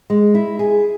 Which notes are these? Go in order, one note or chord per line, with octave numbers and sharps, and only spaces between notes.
G#3
E4
G#4